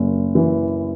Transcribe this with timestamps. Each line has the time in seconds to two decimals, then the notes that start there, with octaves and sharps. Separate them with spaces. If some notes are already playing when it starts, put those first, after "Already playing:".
Already playing: F#1
0.35 E3